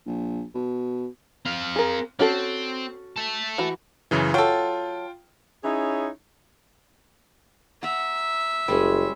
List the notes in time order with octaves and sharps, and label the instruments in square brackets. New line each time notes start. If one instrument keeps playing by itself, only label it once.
[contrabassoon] A#1
B2
[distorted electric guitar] C4 F5
[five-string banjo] G#4 A#4
[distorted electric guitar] C4 [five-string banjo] C#4 F#4 A4
[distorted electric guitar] E5 A5
[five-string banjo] E3 F#4
[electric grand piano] F#2 C#3 E3
[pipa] F#3 A4 [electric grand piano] F4 G5
[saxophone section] C#4 D#4 E4 G#4 C#5
[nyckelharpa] E5 [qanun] F#5 A#5
[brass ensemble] F#1 [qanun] G3 G#3 C#4